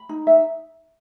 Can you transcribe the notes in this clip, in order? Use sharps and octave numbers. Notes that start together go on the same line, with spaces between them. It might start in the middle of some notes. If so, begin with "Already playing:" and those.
Already playing: B5
D#4
E5